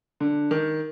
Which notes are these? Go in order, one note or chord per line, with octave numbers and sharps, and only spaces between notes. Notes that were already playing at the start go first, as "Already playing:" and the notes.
D3
D#3